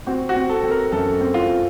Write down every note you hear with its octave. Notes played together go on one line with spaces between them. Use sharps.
C4 F#4
F#4
C4
A4
C4
A#4
F#2 A4
C4
F4